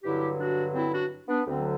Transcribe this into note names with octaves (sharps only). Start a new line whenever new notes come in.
G2 D3 F#3 E4 G4
D4 F#4
C4 E4
D4 F#4
B3 D4
D2 D3 F#3 C4